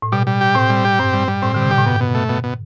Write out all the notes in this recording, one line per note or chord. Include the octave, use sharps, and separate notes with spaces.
A2
B2 G3
G3
G4
A2 C4
G3
G4
G2 C4
G3
G3
A2 C4
D3 G3
C3
B2 G4
A2
G2 B2
B2
A3
B2
B2